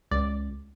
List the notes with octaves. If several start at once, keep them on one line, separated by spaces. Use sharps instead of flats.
C#2 D5